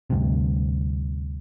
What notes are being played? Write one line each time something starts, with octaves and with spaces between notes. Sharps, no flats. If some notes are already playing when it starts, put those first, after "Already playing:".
D2 G2 C3